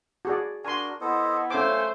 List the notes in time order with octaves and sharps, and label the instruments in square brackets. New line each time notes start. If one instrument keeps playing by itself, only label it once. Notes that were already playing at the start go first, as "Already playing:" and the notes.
[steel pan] F#4 G#4 D5
[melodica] D4 F#4 A#4 [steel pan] G#5 C6
[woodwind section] B3 E4 [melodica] A4 C5 D#5
[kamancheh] A3 C5 [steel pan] C#4 D6 [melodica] F5 G#5